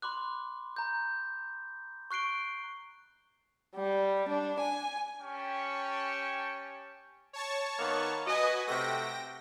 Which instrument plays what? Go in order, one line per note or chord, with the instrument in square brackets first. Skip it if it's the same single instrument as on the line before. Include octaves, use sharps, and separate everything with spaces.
[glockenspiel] B5 C6 D6 F#6
A#5 G6
C#6 F#6 C7 D7 G7
[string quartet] G3
D4
G#5
[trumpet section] C#4 G4 G5 A5 C#6
[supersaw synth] C#5 A5 C#6
[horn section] D#3 A#3 B3
[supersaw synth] F#4 B4 G#5 [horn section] D#5
[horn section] C3 A3 F#4 [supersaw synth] G5 A#6